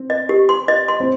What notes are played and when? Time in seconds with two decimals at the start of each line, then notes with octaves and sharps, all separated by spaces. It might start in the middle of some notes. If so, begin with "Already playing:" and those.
Already playing: C4
0.10 D#5
0.29 G4
0.49 C6
0.68 D#5
0.88 C6
1.00 C4